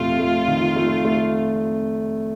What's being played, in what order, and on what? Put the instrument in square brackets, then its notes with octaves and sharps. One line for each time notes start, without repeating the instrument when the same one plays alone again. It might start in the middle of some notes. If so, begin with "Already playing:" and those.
Already playing: [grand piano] F1 A3 [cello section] F4
[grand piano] A3
D#3
A3
A3